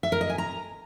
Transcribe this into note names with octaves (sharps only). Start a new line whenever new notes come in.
E5
A#4
D#5
G#5
A#5